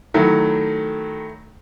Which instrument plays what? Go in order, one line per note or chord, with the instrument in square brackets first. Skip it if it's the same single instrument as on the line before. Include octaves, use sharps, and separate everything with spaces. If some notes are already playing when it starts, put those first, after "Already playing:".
[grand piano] D#3 F#3 A3 E4